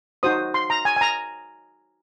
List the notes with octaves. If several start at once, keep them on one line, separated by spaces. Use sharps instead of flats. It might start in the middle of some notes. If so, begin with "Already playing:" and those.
D#4 F#4 C5 D#6
C6
A#5
G#5
G#5
A#5